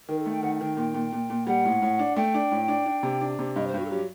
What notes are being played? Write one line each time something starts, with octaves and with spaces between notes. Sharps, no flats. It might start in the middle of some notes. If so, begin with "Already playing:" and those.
D#3 A#4
A4
A3
G5
D#3 F#5
F#5
D#3 G5
A#2 G5
A#2
A#2
A#2
G3 F#5
A2
A2
D4
A3 G5
D4
A2
D4
D4
C3
D4
C3
G2 D#5
C5
G2
F#4
A4
F#3 G4